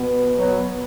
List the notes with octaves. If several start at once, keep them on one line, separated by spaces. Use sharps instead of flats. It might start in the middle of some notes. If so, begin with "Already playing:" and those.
Already playing: B2 B3
B2 F#3